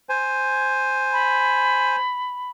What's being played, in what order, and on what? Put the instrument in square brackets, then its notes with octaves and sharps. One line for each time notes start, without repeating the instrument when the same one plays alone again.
[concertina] C5 G#5
[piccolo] B5